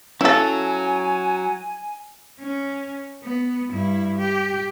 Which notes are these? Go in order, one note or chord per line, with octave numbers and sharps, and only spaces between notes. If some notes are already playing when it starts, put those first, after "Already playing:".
F#3 C#4 E4 A4 C#5 F5 G#5
C#4
B3
G2 E4
G4